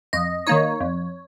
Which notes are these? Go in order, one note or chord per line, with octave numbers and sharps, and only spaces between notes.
F2 D#5
D#3 A#3 D#4 C#5
F2